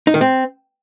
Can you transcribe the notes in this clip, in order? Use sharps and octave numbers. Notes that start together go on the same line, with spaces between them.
D#4
D#3
C4